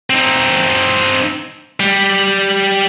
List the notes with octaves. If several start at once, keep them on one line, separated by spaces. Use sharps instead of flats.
C4 D#4
G3